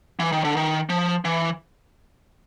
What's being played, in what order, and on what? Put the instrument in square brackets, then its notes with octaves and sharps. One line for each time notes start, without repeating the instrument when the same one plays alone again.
[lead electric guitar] E3
D#3
D3
D#3
F3
E3